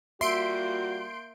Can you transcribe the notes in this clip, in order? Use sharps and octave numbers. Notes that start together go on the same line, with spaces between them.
G3 A#3 F4 F#4 E5 C6 G6 D7